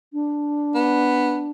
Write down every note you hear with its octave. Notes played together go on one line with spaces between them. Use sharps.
D4
B3